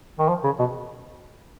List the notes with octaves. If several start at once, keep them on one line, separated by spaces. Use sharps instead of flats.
D#3
F3
C#3
B2